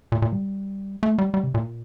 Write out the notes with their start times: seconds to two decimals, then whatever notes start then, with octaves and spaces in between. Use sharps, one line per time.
0.12 A#2
0.22 A#2
0.33 G3
1.03 A3
1.18 G3
1.34 G3
1.44 C3
1.54 A#2